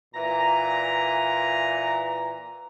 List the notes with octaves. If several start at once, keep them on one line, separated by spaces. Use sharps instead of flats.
A#2 E3 A#5